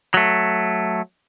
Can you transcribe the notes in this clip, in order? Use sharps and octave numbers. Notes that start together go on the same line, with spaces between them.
F#3 A3